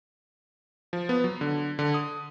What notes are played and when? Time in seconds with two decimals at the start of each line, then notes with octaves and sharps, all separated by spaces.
0.93 F3
1.09 B3
1.24 F#3
1.41 D3
1.79 D3
1.94 D#6